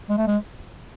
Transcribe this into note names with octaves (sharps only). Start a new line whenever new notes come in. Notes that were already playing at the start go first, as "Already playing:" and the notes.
G#3
A3
G#3